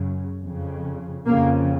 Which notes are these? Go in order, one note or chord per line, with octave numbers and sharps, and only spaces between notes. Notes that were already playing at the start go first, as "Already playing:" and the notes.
Already playing: F#2 C#3
F2 C#3
F2 C#3 A#3